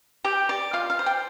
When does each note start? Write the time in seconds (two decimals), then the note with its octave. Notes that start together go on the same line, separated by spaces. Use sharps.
0.24 G4 G5
0.49 D5
0.73 F4 F5
0.90 F5
0.99 C5
1.06 G5